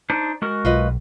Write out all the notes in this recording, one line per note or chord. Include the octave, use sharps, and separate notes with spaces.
D4 D#4 C5
G#3 F#4 A#4
B1 F4 B4 D#5